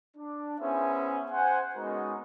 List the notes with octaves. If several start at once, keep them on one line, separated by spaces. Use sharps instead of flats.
D4
B3 C#4 E4 G#4 C5 E5
C5 F#5 G#5
G#3 B3 C#4 D#4 F#4 A#4